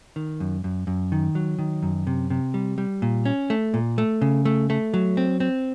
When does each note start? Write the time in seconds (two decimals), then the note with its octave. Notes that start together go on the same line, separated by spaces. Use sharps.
0.16 D#3
0.40 F#2
0.64 F#2
0.87 F#2
1.12 D#3
1.35 F#3
1.59 D#3
1.83 F#2
2.07 C3
2.30 C3
2.54 G3
2.78 G3
3.02 A#2
3.25 C#4
3.50 A3
3.74 A#2
3.98 A3
4.21 C#3
4.45 A3
4.70 A3
4.94 F#3
5.17 C4
5.40 C4